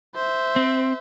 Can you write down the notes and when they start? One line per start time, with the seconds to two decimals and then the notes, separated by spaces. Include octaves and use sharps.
0.15 C5 E5
0.56 C4